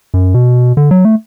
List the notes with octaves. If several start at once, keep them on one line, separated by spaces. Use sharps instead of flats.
F#2
B2
D3
F#3
A3